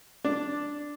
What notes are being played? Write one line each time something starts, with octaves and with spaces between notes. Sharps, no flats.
D4